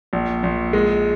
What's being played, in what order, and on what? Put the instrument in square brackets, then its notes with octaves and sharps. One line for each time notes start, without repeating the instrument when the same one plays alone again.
[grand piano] A#1
A#1
G#3